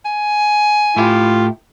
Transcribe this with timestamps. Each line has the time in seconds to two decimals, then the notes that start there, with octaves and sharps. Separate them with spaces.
0.05 G#5
0.96 A2 E4 F4 G4